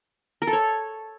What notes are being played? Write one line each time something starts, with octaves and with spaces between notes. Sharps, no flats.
A#4
A4
C#5